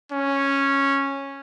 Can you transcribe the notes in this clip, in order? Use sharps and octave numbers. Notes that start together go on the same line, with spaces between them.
C#4